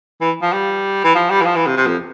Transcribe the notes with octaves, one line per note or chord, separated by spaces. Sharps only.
E3
F3
G3
E3
F3
G3
E3
F3
E3
C3
C3
F2